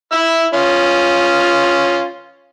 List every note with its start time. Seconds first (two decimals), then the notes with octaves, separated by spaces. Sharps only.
0.12 E4 E6
0.54 C#4 F4